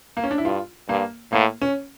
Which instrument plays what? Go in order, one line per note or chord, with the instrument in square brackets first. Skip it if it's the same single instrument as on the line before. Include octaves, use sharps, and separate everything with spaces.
[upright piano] A#3
C#4
D4
E4
[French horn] G2 [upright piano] F4
[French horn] G2 [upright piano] A#3
[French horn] A2 [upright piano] A#3
[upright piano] C#4